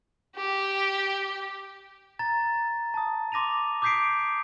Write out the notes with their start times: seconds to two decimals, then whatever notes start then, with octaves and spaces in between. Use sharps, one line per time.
0.36 G4
2.19 A#5 A6
2.94 A5 D#6
3.32 C6 D6 A#6 D#7 F7
3.82 D6 D#6 G6 B6 C7 D7